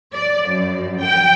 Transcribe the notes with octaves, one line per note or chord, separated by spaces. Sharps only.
D5
F#2
G5